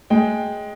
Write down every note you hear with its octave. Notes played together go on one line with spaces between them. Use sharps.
G#3 G5